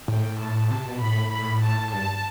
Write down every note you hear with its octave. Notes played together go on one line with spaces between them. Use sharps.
A2 G5
A5
C3
B2
A2 B5
A2
B5
A5
G2 A5